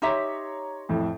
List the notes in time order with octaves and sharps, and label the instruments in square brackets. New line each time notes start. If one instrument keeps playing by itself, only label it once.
[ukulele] D#4 G4 E5 [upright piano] C#5 A#5 C6
[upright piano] F2 A2